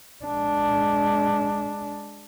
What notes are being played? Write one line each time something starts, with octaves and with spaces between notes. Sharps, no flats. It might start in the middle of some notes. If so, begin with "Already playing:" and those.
G#3 D4